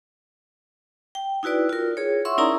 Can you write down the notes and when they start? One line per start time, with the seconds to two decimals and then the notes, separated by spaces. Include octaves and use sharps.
1.15 G5
1.43 D#4 E4 F#4 B4 D5
1.69 F4 A#4
1.97 G#4 C#5
2.25 E5 F#5 C6 C#6 E6
2.38 C#4 D#4 E4 A#4 D5 A#5